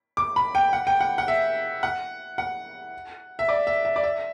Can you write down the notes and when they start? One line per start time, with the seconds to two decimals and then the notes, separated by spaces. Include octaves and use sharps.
0.17 D6
0.36 B5
0.55 G5
0.73 F#5
0.87 G5
1.00 F#5
1.18 F#5
1.28 E5
1.83 F#5
2.38 F#5
3.39 E5
3.49 D5
3.67 E5
3.85 E5
3.96 D5
4.03 E5